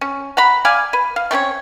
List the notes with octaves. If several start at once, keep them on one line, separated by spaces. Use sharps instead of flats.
C#4
F#5 A#5 B5
D5 F5 G#5
B4
F5
A3 C4 C#4 C#5